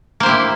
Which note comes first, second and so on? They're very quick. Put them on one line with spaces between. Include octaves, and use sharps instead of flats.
A#3 C5 G4 E4